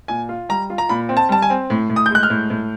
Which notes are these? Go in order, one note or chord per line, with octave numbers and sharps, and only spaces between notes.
A#2 G#5
F4
G3 A#5
F4
A#5
A#2 B5
C4
A5
G3 A5
G#5
C4
A2
A2
D#6
G6
G#3 F#6
F6
A2
A2